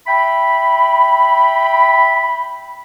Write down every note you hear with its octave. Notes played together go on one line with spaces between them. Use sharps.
E5 G5 B5